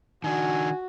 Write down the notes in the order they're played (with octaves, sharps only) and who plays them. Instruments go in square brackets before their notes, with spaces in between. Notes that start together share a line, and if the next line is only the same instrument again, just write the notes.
[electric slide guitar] D#3 D4 [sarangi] F#4 [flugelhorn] G#5